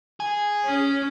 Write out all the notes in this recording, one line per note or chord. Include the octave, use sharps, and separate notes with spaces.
G#4
C#4